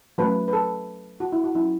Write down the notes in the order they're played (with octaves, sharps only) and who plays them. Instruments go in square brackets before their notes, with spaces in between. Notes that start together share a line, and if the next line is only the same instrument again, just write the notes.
[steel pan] F#3 A3 C#4 B4
B4
A4
F#4
E4
F#4
F#3 C#4 E4